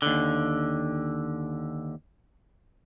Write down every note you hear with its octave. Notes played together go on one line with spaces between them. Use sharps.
D#2 D3